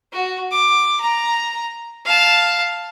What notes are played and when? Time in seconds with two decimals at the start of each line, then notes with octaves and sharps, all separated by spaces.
0.12 F#4
0.52 D6
1.00 A#5
2.05 F5 A5